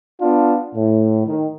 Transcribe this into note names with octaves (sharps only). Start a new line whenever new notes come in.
B3 D4 F4
A2
D#3